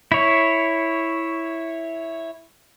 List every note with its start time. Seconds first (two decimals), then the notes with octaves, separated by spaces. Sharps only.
0.12 E4 C#5